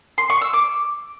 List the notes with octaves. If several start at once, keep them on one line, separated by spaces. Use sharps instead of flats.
C6
C#6
E6
D6